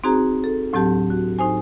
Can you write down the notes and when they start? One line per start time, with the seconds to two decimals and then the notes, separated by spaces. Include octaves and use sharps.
0.04 C4 D#4 F#4 G#4 C5 A#5
0.44 A4
0.73 D2 A2 F#3 C4 G4 A5
1.10 F#4
1.39 A2 D#4 C5 G#5